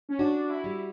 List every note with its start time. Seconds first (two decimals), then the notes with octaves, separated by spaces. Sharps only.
0.09 C#4
0.19 D4 F#4
0.49 E4
0.64 G3